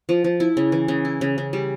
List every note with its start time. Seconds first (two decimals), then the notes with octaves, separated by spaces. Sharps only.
0.09 F3
0.24 F3
0.40 E4
0.57 C#3
0.72 E3
0.88 C#3
1.05 E4
1.21 C#3
1.38 C#3
1.53 G3